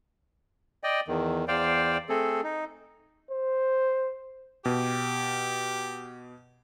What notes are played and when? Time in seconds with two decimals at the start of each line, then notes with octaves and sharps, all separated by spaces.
0.84 D5 D#5 G5
1.08 E2 D#3
1.48 E2 C5 D5 F5 G5
2.09 A3 C4 G#4 A4
2.44 D#4
3.31 C5
4.65 B2 G4